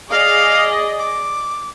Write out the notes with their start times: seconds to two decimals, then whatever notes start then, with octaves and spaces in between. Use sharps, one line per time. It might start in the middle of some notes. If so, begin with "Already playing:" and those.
0.10 G#4 D5 D#5 F5
0.98 D6